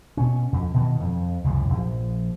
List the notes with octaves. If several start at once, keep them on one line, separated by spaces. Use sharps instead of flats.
B2 C#4
F2
B2 D#3 E3
F2
C#2 F#2 C3 E3
A#1 F3